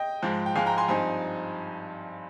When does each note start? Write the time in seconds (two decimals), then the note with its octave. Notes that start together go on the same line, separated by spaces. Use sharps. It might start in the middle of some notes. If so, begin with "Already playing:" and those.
Already playing: D#5 G5
0.22 G#2 F3 G#3
0.46 G5
0.56 G#2 F3 G#3 F5 G#5
0.66 G5 A#5
0.78 G#5 C6
0.88 G2 F3 C4 D#4 G#5 C6